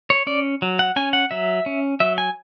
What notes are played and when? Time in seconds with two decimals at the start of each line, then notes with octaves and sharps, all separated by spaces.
0.10 C#5
0.27 C#4 D5
0.62 F#3
0.79 F#5
0.96 C#4 G#5
1.13 F#5
1.31 F#3 E5
1.66 C#4
2.00 F#3 E5
2.18 G#5